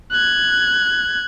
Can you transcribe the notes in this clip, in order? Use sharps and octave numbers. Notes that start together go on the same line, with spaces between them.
F#6 G#6